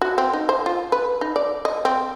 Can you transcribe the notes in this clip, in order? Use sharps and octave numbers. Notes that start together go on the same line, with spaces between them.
F#4
C4
D#4
C5
F4
B4
D#4
D5
D#5
C4